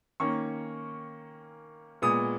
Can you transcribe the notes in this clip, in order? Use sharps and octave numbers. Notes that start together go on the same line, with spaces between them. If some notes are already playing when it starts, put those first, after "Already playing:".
D#3 A#3 C#4 C#6
A#2 G#3 B3 D#6